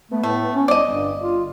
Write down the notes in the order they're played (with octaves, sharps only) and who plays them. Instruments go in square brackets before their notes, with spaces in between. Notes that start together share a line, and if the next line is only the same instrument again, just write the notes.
[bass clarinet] A3 [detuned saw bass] B3
[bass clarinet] A2 [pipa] A3
[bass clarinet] C#4
[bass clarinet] C2 [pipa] D5 D#5
[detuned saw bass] G1 [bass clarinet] G2
[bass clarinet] F4